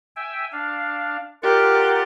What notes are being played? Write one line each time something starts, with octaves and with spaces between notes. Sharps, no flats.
E5 G5 G#5
D4 F5
F4 G4 A#4 D5 F#5